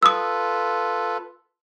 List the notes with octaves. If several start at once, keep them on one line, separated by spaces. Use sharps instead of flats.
F4 A4 B4 D#6 E6